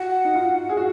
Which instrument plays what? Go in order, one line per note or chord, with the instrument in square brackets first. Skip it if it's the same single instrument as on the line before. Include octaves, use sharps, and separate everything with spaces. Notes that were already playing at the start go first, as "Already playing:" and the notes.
Already playing: [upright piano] F#4 [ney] F#5
[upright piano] D#4
F4
G#4
F#4